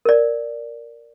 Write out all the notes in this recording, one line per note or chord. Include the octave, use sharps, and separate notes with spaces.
A#4 D5